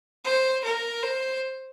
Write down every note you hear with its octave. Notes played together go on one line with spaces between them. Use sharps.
C5
A#4
C5